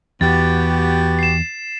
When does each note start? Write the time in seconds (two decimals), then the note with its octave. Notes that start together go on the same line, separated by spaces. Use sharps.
0.21 E2 B3 F#4 G4 A6
1.19 C7 E7